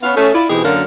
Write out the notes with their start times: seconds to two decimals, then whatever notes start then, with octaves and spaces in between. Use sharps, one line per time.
0.02 B3 C#4 F5
0.16 A3 C#4 G#4
0.33 E4 F4 D5
0.49 B2 E3 C4 D#4 G4 G#4
0.63 F#2 D3 F#3 A#3 A#4 F5